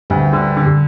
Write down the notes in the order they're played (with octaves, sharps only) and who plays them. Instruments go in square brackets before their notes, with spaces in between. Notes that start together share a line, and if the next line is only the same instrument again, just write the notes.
[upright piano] D2 [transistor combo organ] G2 G3
[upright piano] D3
D3